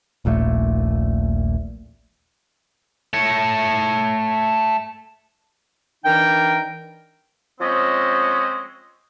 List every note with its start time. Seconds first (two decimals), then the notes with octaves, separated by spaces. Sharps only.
0.25 D#1 A#1 A#2 A3
3.13 A3 C#5
6.05 E3 D4 D#4 A#4 G5
7.60 F3 G#3 C4 C#4 D#5